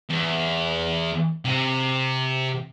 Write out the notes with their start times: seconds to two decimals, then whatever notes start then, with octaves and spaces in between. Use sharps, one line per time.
0.09 E2
1.45 C3